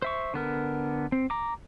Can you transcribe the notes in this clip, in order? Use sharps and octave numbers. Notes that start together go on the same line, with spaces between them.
C5 E5 C#6
D3 B3 A#4
C4
A#5 D6